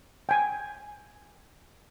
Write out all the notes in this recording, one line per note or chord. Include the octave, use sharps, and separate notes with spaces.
G5 G#5